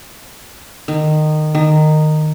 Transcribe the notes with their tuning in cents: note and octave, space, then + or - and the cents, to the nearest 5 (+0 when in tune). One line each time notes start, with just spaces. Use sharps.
D#3 -20
D#3 -15